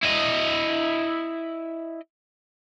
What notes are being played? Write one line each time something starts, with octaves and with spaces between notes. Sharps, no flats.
E4 D#5